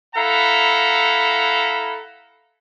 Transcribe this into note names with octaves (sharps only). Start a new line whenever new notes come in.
E4 A4 F5 F#5 A#5 B5